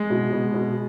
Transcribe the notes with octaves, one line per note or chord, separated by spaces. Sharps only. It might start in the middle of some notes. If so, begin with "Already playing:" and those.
Already playing: G#3
B2
B2
B2